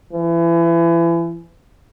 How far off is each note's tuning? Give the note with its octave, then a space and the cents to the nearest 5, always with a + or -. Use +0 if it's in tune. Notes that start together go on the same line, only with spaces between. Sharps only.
E3 +30